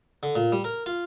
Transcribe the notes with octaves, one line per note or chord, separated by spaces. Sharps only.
D3
A#2
G3
A#4
F4